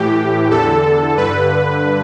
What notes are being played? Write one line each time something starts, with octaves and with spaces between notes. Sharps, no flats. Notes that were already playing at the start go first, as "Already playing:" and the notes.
Already playing: A2 E3 G4
E2 D3 A4
G2 D3 B4